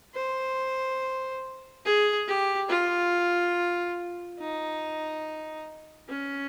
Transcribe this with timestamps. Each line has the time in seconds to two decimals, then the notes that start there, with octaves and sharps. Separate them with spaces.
0.15 C5
1.85 G#4
2.28 G4
2.69 F4
4.40 D#4
6.09 C#4